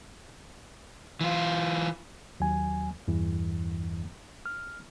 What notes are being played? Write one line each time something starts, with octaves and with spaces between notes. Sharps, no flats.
E3 F4
D#2 F#3 G#5
E2 G2 E3
F6